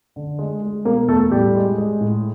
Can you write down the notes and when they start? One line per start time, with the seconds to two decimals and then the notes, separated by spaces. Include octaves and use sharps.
0.16 D3
0.39 G#3
0.63 G#3
0.85 B2 A#3 A#4
1.08 E2 A3 A4
1.31 A2 G3 G4
1.55 G#3
1.78 G#3
2.01 A2